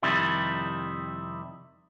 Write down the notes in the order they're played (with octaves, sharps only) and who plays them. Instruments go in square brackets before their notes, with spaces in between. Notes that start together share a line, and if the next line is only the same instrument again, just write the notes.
[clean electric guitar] F2 C3 D#3 G3 E4